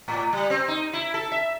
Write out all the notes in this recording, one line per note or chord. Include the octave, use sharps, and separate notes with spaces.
A2
G3
C4
D#4
E4
A4
E5